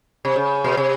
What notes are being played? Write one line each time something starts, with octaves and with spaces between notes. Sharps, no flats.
C3
C#3
B2
C3